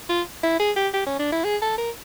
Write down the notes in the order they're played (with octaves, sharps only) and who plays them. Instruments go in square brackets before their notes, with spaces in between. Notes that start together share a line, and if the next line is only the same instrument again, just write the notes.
[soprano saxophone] F4
E4
G#4
G4
G4
C#4
D4
E4
G#4
A4
A#4